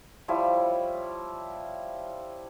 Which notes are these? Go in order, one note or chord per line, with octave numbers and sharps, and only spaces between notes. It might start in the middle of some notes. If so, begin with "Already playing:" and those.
F3 G3 E4 C#5